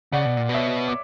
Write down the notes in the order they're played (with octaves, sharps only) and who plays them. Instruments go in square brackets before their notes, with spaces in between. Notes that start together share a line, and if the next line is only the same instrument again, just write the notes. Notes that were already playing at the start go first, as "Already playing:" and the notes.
[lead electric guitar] C#3 [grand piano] D5 F#5
[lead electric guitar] B2
A#2
B2
[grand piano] C#5 E5
D6